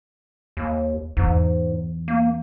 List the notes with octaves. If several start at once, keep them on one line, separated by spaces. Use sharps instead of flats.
D#2
E2 G#2
A#3